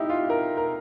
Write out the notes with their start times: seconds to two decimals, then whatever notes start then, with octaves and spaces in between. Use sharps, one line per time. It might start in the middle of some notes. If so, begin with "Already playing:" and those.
Already playing: D#4 E4 G4
0.09 F4
0.30 A#4
0.57 A#4